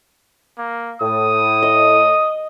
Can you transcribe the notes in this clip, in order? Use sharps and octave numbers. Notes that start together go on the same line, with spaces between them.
A#3
A2 D#6
D#5